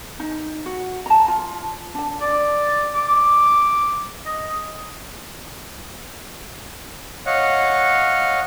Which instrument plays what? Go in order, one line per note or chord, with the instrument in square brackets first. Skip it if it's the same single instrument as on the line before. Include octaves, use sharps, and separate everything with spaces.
[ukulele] D#4
F#4
A5 A#5
F4
D4 A5
[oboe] D5
D6
D#5
[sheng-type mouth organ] C#5 D#5 F5 F#5